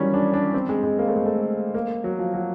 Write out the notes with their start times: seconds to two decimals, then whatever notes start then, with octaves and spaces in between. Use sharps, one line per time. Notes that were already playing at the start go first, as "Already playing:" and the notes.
Already playing: D#3 E3 F#3 G3 C#4
0.14 D4
0.34 D4
0.54 C4
0.69 G#3
0.83 G#3
0.99 A#3
1.08 A3
1.17 G#3
1.26 A3
1.74 A#3
2.04 F#3
2.19 F3
2.34 F#3